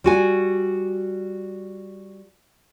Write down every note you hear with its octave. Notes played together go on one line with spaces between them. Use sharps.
G3 F#4 G#5